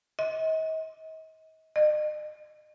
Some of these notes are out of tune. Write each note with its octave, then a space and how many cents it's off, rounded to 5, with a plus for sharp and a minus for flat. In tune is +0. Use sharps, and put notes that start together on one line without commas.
D#5 +40
D#5 -40